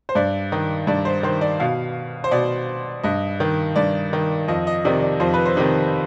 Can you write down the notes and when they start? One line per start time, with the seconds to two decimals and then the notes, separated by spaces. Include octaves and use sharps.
0.09 C5
0.15 G2 D5
0.52 D#3
0.87 G2 D5
1.05 C5
1.23 D#3 C5
1.41 D5
1.60 B2 F5
2.24 C5
2.31 B2 D5
3.03 G2 D#5
3.40 D#3
3.76 G2 D5
4.13 D#3
4.48 F2 D#5
4.67 D#5
4.85 C3 D#3 D5
5.02 D5
5.20 F2 C5
5.34 B4
5.45 C5
5.57 C3 D#3